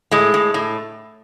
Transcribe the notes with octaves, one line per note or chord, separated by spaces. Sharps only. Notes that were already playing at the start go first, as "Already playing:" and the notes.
A2 G#3
A2
A2